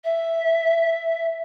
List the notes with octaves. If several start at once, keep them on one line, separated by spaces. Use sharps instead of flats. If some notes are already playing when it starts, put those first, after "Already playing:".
E5